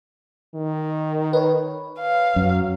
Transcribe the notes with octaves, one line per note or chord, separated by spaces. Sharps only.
D#3
B4 C#5
F5
F#2 F#3